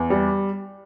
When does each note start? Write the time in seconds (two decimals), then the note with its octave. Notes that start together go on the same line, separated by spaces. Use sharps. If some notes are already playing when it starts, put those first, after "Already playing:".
Already playing: E2
0.10 G3